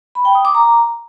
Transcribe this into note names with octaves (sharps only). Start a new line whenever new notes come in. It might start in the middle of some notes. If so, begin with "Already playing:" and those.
B5
G5
D#6
D6
A#5